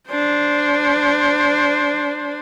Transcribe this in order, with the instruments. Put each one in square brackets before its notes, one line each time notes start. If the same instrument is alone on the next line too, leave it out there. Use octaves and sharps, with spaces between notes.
[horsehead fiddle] D4 C5